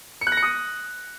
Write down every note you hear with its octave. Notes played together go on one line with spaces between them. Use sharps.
C#7
F#6
A#6
C#7
D#6